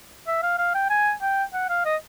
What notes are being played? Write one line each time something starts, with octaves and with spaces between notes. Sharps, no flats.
E5
F5
F5
G5
G#5
G5
F#5
F5
D#5